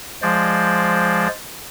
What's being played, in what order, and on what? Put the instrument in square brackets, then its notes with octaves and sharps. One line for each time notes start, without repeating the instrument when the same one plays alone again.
[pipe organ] F3 G#3 C5 D5